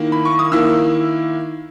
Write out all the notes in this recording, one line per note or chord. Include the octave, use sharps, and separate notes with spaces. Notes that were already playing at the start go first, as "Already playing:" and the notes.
Already playing: D#3 A#3 E4
B5
C#6
D#6
D#3 A#3 E4 E6